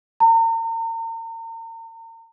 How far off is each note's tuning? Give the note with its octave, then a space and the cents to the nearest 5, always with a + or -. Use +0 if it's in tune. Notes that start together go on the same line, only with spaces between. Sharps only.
A#5 -40